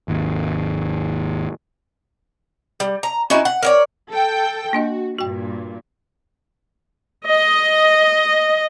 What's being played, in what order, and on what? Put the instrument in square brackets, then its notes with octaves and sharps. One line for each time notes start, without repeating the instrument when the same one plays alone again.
[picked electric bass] G#1 D#2
[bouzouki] G3
A#5
C#4 D#4 E4 F#4
F#5
A#4 C#5 D5
[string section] A4 G5
[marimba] A#3 D4 D#5 [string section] F#4
[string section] G2 A#2 [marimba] F#4 G5
[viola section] D#5